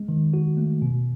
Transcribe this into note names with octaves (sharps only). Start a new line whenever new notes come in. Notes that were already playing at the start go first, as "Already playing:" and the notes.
Already playing: G#3
D#3
F#4
A3
B2